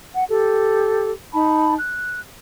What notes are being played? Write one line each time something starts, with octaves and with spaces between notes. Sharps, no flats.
F#5
G4 A4
D#4 A5 B5
F#6